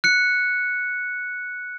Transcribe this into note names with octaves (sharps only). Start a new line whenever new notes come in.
F#6 C#7